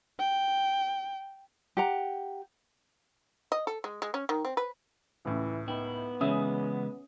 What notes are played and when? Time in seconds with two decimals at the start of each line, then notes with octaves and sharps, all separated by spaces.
0.19 G5
1.77 G4 F#5 A#5
3.52 D#5
3.67 A4
3.84 G#3
4.02 G#3
4.14 C#4
4.29 D#3
4.45 C4
4.57 B4
5.25 C#2 A2 E3
5.68 B3 D#4 E4 G5
6.21 C#3 E3 G#3 C#4 E5 D#6